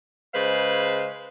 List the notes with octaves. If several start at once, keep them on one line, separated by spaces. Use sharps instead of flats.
C#3 G#3 B4 C5 F5